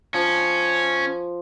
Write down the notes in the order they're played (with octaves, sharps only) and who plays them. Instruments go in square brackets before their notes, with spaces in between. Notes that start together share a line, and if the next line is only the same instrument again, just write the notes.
[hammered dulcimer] F3 [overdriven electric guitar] C#4